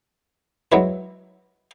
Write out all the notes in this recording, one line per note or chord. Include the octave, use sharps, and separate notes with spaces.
F#3 G#3 C#4 E4 F#4 B4